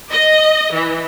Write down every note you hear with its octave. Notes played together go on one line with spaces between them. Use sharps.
D#5
E3